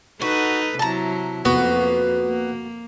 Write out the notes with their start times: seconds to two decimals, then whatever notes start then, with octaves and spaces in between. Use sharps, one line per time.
0.22 D#4 F#4 A4 B4
0.79 C3 F#3 E4 A5 A#5
1.45 F2 A#3 B3 F#4
2.26 A#3